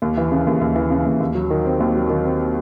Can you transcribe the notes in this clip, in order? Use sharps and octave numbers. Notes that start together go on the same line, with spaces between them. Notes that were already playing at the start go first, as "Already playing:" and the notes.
D#2
E3
C#3
D#2
D#2
E3
C#3
D#2
D#2
F#3
D#3
C4
D#2
F#3
D#3
C4